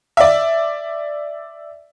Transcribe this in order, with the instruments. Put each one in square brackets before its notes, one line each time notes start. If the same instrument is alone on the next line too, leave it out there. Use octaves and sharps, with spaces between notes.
[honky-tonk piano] D5 E5